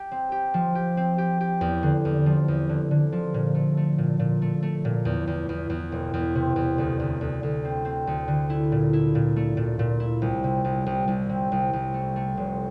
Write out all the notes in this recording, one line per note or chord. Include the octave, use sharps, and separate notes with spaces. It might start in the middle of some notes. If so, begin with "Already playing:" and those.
Already playing: G4
C4
G4
F3
G4
C4
G4
G4
E2
D3
E2
F3
E2
D3
D3
F3
A#2
A3
A3
A#2
A#2
A3
A3
A#2
E2
E2
E2
E2
E1
E2
C3
E2
D2
D2
D2
D2
C4
C4
D2
D3
E4
A#2
E4
A#2
A3
A#2
A#2
E4
C2
C3
C2
C2
C2
C3
C2
C2
A3
A3
F1